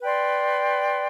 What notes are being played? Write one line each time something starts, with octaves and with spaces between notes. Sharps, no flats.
B4 D5 G5 C6